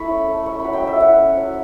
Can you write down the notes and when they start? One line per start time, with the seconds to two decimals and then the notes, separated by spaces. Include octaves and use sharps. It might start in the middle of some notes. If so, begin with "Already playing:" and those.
Already playing: A3 E4 B5 C#6
0.10 C#4
0.28 A3
0.46 C#4 C#6
0.60 F#3 B5
0.73 G5
0.83 F#3 E5
1.00 E4 F#5
1.18 C#4
1.37 F#3